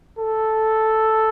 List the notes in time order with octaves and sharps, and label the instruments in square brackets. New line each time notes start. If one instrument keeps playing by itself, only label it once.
[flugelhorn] A4